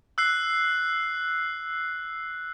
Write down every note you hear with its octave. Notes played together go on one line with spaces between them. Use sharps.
E6 F#6 C7